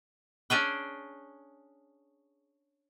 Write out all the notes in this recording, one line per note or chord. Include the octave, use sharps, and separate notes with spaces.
C#4 D4 G#4 G5